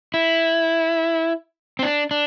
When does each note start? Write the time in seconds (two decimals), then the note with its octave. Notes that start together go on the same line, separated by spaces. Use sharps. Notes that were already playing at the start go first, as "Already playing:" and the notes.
0.14 E4
1.79 C4
1.83 D4
2.11 D4